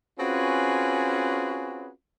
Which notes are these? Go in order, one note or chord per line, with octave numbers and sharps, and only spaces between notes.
C4 C#4 F4 F#4 G#4 B4